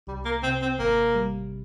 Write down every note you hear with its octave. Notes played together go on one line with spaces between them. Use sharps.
C2 G3
A#3
C3 C4
C4
G#1 A#3
G3